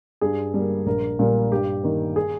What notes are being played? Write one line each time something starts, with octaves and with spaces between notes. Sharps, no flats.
G2 G#4
G3 A#3
A#1 A#4
A#2 G3 A#3
G2 G4
D#3 A#3
G#4